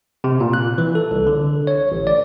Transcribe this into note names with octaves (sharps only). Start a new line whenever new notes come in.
C3
A#2
F#6
E3
A4
C2
D3
C#5
A1
D5